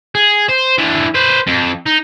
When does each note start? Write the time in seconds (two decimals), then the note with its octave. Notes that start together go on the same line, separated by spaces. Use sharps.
0.15 G#4
0.49 C5
0.78 E3 D4
1.14 B4 C5
1.47 F2
1.86 D#4